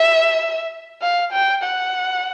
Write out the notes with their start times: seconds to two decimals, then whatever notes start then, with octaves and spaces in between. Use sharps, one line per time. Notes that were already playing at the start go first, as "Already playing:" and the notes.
Already playing: E5
1.02 F5
1.33 G5
1.63 F#5